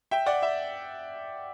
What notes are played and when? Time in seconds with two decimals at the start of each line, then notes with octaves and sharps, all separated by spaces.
0.11 E5 G5
0.26 D5 F#5
0.42 E5